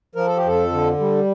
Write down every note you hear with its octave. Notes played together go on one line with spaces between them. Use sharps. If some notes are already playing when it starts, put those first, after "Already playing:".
F3 A#4
A4
G4
F2 A4
D3
G3